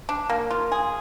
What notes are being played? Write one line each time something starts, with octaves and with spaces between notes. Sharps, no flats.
D4
A#3
F4
G#4